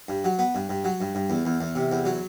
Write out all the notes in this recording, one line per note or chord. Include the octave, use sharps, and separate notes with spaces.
G2
F#3
B3
G2
G2
F#3
G2
G2
E2
E2
E2
C3
E2
F#3